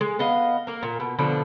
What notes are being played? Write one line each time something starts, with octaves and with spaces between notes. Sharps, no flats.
G#3
B3 D#5 F5
A#3 A#4
A#2
B2
B2 D3 F3 D4